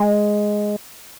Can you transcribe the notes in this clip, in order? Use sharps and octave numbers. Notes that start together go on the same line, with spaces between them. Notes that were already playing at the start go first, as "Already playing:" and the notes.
Already playing: G#3